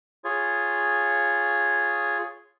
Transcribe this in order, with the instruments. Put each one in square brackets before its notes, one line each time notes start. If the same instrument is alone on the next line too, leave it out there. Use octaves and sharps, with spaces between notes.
[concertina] F4 G#4 C#5